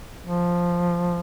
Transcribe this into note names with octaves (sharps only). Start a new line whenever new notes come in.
F3